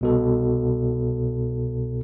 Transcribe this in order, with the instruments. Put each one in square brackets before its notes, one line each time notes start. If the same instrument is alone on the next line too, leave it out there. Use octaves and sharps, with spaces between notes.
[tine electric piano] C2 B2 A4